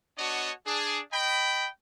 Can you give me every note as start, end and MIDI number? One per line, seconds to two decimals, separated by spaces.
0.18 0.52 59
0.18 0.52 62
0.18 0.52 66
0.18 0.52 73
0.18 0.52 75
0.18 0.52 81
0.66 1.01 62
0.66 1.01 68
1.13 1.68 75
1.13 1.68 79
1.13 1.68 83